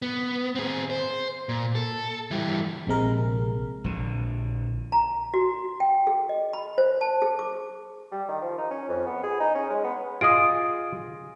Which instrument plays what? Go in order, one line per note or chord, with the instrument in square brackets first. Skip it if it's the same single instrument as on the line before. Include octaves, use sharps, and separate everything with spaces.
[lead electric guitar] B3
C4 G#4
C5
A#2
A4
E3 G3
[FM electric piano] A#1 C3 G#3 A#4
[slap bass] A#1 D3
[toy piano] A#5
F#4
G5
G#4
D#5
B5
C5
A5
G#4
D6
[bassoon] G3
D#3
F3
D#4
C#4
F2
B3
G#4
D#4
C#4
G#3
B3
[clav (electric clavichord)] F4 G#4 D#5 [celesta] D#6 D7